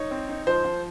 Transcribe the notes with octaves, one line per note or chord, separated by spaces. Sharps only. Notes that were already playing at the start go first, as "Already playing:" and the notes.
Already playing: D#4 C#5
C4
D#4
F3 C5
F3